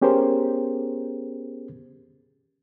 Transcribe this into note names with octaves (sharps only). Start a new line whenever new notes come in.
B3 C#4 G4 G#4 A#4 C5